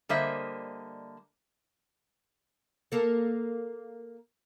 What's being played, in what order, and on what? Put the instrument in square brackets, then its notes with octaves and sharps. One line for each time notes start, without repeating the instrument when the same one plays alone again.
[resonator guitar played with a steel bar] D3 G3 A#3 C5 D#5 E5
[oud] A#3 A4